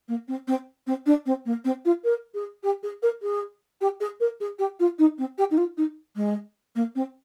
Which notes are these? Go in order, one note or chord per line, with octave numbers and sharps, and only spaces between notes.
A#3
C4
C4
C4
D4
C4
A#3
C4
F4
A#4
G#4
G4
G#4
A#4
G#4
G4
G#4
A#4
G#4
G4
F4
D#4
C4
G4
D#4
F4
D#4
G#3
A#3
C4